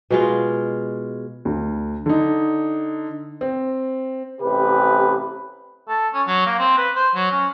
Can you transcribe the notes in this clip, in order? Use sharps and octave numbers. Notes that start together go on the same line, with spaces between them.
B2 G#3 F4
D2
D3 D#4
C4
A1 C3 G4 B4
A4
C#4
F#3
A#3
C4
B4
C5
F#3
C#4